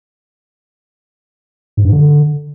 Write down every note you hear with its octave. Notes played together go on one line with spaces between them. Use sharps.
G#2
G2
D3